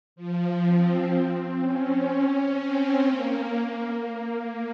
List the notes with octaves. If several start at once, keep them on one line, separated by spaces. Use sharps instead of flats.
F3
C4
C#4
C#4
C4
A#3